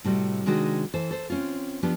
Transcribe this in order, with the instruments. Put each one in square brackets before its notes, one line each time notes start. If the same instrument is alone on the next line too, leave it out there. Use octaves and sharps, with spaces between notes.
[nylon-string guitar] A2 C3 G3 F#4
C3 D#3 G#3 D4 F#4
E3 A4 C5
A4 C5
C4 C#4 F4
F3 B3 D4 G4